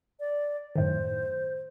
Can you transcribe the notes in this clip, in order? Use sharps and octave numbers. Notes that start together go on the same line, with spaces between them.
D5
F#2 A2 D#3 C5